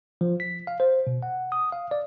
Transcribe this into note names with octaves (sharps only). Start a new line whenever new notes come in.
F3
B6
F5
C5
B2
F#5
D#6
F5
D5